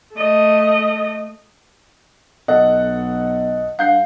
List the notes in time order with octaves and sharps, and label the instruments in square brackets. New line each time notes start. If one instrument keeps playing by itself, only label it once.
[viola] A3 D#5
[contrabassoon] B1 [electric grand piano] A4 F#5 [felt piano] D#5
[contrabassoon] G2 [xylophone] F5 [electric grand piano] F#5 G6 C7